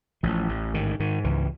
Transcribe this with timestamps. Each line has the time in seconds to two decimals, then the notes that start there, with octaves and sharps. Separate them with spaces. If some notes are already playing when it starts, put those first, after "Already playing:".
0.23 A1 F3
0.49 A1
0.74 G#2 D#3
1.00 G#2 D#3
1.24 C#2 E3